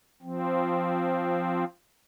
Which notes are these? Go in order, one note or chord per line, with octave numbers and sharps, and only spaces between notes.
F3 C4